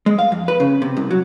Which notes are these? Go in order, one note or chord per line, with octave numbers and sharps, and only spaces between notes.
G#3
F5
F2
B4
C#3
C3
C2
F#3